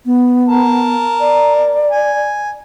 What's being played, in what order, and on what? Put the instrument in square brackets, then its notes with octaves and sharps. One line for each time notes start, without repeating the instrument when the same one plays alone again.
[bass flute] B3
[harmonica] A#4 A5
[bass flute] D5
[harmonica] G#5